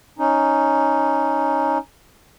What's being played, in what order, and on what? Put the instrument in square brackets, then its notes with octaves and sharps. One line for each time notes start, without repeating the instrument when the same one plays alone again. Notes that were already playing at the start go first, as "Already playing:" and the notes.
[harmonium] C#4 D#4